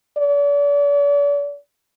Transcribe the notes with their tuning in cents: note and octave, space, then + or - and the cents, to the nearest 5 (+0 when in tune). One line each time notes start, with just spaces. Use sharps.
D5 -40